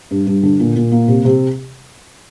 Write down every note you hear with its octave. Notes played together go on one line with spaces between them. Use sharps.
G2
G2
D3
A#2
A#2
A#3
C3
C3